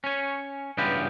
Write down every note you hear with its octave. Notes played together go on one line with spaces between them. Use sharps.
C#4 C#5
G2 C#3 E3 B3 F4 G4